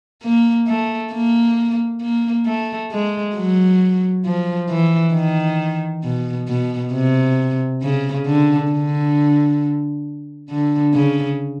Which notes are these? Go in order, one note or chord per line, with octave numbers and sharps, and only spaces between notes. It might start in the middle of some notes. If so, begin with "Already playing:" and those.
A#3
A3
A#3
A#3
A3
G#3
F#3
F3
E3
D#3
B2
B2
C3
C#3
D3
D3
D3
C#3